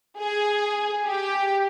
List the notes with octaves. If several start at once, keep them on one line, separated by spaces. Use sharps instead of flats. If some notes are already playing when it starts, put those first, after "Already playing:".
G#4
G4